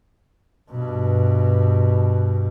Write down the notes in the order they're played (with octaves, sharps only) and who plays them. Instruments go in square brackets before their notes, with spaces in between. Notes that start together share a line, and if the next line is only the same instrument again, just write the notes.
[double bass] G2 B2